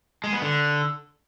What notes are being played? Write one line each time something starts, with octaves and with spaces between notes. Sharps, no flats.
G#3
B3
D3